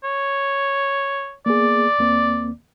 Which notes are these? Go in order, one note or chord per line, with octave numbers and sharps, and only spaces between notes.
C#5
A#3 B3 G#4 D5
D#2 A#3 C4